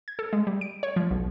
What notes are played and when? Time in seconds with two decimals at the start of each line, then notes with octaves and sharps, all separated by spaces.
0.08 G#6
0.19 A4
0.33 G#3
0.47 G3
0.61 D7
0.83 C#5
0.96 F3
1.11 B1